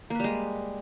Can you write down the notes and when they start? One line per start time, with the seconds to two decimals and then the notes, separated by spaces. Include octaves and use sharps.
0.10 A#3
0.15 B4
0.20 G3
0.24 G#3